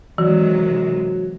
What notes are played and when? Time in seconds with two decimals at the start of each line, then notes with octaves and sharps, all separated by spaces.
0.18 C3 D#3 E3 F#3 G#3